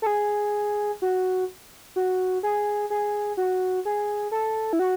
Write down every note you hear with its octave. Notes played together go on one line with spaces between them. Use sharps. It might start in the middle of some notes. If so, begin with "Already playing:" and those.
A4
G#4
F#4
F#4
G#4
G#4
F#4
G#4
A4
E4
F#4